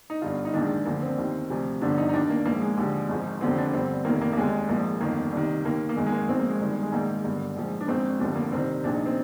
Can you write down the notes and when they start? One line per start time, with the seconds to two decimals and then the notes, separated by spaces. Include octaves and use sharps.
0.10 D#4
0.22 G1 G2 D3 F4
0.45 D#4
0.54 A#1 G#2 D#3 D4
0.85 D2 D3 F3 A#3
1.02 C4
1.18 D#2 D#3
1.50 D2 C3 F3
1.81 G1 G2 D3 F3 D4
1.98 D#4
2.09 D#4
2.13 D#2 D#3 D4
2.30 A#3
2.46 A#1 G#2 F3 A#3
2.62 G#3
2.77 D#2 D3 F3
3.09 G#1 G#2 F3
3.41 F1 D#2 D3 F3 C4
3.57 D4
3.73 G1 G2 D3 C4
4.05 F1 D#2 D#3 A#3
4.21 A#3
4.33 A#3
4.37 F1 D#2 D#3 G#3
4.69 A#1 G#2 F3 A#3
5.00 G1 F2 D#3 A#3
5.32 C2 C3 D#3
5.64 D#2 D#3 A#3
5.89 A#3
5.96 G#1 G#2 D#3 G#3
6.06 G#3
6.12 A#3
6.28 G#1 G#2 F3 C4
6.39 A#3
6.49 G#3
6.60 G1 G2 D#3
6.83 G#3
6.92 A#1 G#2 D#3 A#3
7.24 G1 G2 D3
7.56 A#1 G#2 F3
7.81 D4
7.88 G#1 G#2 F3 C4
8.20 F1 D#2 D3 F3 D4
8.36 A#3
8.52 C2 C3 D#3 C4
8.84 A#1 A#2 F3 D4
8.94 D#4
9.06 C4